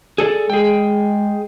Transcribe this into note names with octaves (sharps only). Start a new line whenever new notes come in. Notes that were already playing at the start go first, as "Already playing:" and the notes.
G#4 A4 D5
G#3 G#4 G5